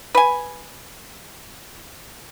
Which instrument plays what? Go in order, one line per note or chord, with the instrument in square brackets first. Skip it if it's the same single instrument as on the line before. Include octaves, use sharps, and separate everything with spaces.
[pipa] B4 G#5